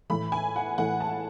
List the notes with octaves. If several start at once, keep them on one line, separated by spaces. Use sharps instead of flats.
A2 E3 A3 B5
G#5
F#5
A2 E3 A3 F#5
A5